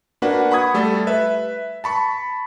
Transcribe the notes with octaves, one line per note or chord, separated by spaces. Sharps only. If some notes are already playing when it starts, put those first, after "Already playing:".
A#3 D4 F#4 B4 F#5
F#5 B5 C#6 D#6 G#6
G3 A3 A4
B4 E5
A5 B5 C#6